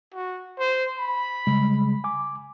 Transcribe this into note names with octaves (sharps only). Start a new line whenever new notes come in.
F#4
C5
B5
C#3 G3 G#3
G#5 D6